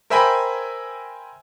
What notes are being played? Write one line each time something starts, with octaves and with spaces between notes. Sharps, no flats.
A#4 C5 E5 G5 G#5 B5